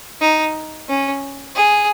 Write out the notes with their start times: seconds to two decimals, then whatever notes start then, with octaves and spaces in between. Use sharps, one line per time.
0.21 D#4
0.89 C#4
1.56 G#4